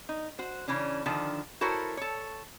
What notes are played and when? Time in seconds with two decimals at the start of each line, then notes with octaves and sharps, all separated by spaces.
0.09 D#4
0.39 F#4 C5
0.68 C#3 E3 C#4 D4
1.06 D3 D#3 F3 D4
1.61 E4 F#4 A4 A#4 C5 C#5
1.97 A4 C#5